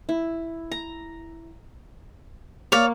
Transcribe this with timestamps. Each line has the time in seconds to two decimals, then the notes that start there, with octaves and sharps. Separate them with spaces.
0.09 E4
0.71 A#5
2.72 A#3 C#5 D5 F5